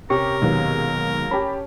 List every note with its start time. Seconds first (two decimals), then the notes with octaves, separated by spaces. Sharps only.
0.10 C3 C#4 G4 A#4 C#6
0.42 D#2 B2 D#3 F#3 G#3 B3
1.31 C#4 G4 A5 B5